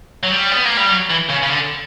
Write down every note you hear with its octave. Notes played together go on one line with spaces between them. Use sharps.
F#3
G3
B3
A#3
G3
F#3
E3
C#3
C#3
D3